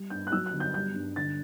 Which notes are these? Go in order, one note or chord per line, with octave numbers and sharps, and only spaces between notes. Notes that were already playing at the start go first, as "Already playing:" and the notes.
Already playing: G3
G2 G6
F#6
F#3 E6
F#6
G1
G6
G3 G6
G2
D3 A6